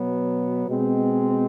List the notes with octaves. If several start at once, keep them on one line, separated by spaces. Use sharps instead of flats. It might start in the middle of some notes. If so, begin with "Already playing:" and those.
Already playing: B2 F#3 B3
B2 G#3 C4